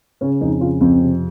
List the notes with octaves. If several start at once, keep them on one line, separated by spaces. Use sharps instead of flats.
C#3 C#4
F2 D#4
C#3 F4
F2 C4
C3